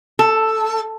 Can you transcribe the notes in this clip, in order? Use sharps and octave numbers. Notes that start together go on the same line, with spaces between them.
A4